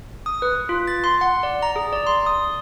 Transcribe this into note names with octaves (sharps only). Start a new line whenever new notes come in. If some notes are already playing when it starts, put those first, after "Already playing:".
D#6
B4
F4
A6
C6
F#5
D5
A#5
G#4
D5
C6
D#6